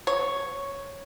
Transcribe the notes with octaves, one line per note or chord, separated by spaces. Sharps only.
C#5